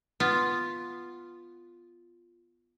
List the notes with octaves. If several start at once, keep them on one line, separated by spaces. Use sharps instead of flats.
B3 F4